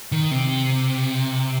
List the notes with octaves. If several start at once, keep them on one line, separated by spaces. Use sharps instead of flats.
D#3
C3